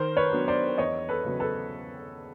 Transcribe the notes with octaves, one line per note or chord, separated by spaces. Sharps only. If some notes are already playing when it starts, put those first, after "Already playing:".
Already playing: D#3 A#4 C5
B4 C#5
F#3 B3 D4
C5 D5
E2 C#5 D#5
A4 B4
C#3 F#3 B3
A4 B4